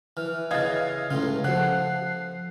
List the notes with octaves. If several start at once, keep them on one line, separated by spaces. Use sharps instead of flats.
E3 F6
C#3 E3 D#5 F5 G#6 A6
C#2 A2 C#3 F4
F3 A4 F#5 F#6 C7